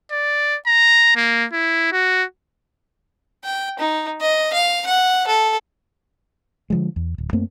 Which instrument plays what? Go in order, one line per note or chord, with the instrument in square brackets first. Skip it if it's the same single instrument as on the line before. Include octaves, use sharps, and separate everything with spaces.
[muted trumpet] D5
A#5
A#3
E4
F#4
[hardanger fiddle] G5
D#4
D#5
F5
F#5
A4
[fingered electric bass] D3 F3 G#3
E2
D1
F#2 A3 A#3 C4